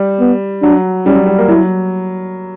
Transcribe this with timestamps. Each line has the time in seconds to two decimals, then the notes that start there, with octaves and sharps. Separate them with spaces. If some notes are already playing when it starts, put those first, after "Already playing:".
Already playing: G3
0.20 B3
0.62 F#3 D4
1.06 G3 C#4
1.16 F#3
1.26 G3
1.38 A#3
1.48 F#3 E4